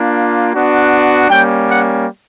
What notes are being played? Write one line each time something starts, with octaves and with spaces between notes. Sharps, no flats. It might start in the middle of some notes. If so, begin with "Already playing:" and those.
Already playing: A#3 D4 F4
B3 D4 F#4
G3 A#3 C#4 G5
F#5